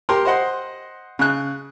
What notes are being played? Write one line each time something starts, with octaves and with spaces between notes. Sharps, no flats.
G4 A#4 C6
C5 D#5 F#5 C6
C#3 F#6